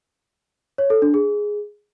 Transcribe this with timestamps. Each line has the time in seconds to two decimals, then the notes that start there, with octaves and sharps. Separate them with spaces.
0.78 C#5
0.90 A4
1.02 D4
1.14 G#4